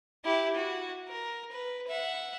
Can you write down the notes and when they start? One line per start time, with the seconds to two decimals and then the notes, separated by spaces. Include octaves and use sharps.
0.25 E4 G4
0.55 F#4
1.08 A#4
1.52 B4
1.87 E5 F#5